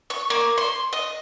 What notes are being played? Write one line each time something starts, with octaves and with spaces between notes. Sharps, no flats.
C#6
A#3
C6
D#5